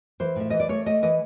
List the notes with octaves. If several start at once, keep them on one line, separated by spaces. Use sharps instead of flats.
E3 C5
A2 E5
E3 D#5
D5
A3 C#5
A3 D#5
E3 D#5